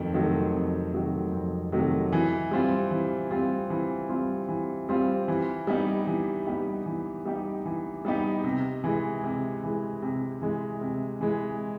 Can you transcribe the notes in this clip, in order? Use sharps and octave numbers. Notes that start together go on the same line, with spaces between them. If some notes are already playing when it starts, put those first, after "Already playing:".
Already playing: F2 D#3 F#3 A3
C3 D#3 F#3 A3
F2
C3 D#3 F#3 A3
F2
C3 D#3 F#3 A3
E3
G3 C4 F4
E3
G3 C4 F4
E3
G3 C4 F4
E3
G3 C4 F4
E3
G3 B3 D#4 G4
E3
G3 B3 D#4 G4
E3
G3 B3 D#4 G4
E3
G3 B3 D#4 G4
C3
E3 G#3
C3
E3 G#3
C3
E3 G#3
C3
E3 G#3